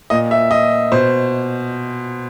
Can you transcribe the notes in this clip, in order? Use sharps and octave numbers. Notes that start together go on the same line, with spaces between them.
A#2 D#5
E5
D#5
B2 C5